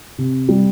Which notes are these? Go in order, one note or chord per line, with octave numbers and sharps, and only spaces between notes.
C3
G3